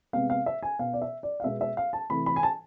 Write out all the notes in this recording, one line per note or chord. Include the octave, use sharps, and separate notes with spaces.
C3 G#3 B3 F5
F5
E5
G#5
B2 B3 F5
D5
E5
D5
F5
B2 G#3 B3 E5
E5
F5
A5
C3 E3 A3 B5
B5
G#5
A5